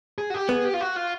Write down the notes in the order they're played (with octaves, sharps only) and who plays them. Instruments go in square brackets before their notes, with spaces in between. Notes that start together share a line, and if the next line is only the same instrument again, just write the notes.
[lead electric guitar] G#4
F#4
G4
[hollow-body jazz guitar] B3 [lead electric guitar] G#4
[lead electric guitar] G4
F4
F#4
F4